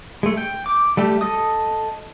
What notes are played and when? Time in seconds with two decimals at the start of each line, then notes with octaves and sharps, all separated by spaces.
0.23 G#3 A3
0.37 G5
0.66 D6
0.97 G3 A3 G4
1.21 A4 D#5 D#6